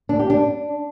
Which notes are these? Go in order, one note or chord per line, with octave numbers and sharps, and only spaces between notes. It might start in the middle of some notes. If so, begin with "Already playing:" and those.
D4
G4
D4